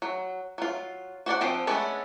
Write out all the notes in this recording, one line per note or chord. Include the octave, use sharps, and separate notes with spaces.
F#3
F#3 F4
F#4 C5 D5 F#5
F3 C4 G4 C5
G#3 A3 B3 C#4 D4